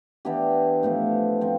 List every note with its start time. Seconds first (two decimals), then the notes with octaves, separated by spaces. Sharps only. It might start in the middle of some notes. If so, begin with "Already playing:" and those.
0.25 E3 B3 D4 G4
0.83 A2 F3 B3
1.41 F3 C4